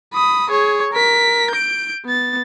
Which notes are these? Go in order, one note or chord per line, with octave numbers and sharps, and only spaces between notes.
B5 D#6
G#4 C#5
A#4 B6
G6 D7
B3 A6